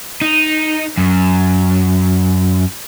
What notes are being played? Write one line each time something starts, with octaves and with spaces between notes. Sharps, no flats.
D#4
F#2